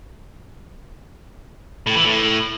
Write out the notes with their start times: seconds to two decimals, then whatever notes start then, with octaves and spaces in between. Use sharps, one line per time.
1.87 A2
1.96 E3
2.05 A2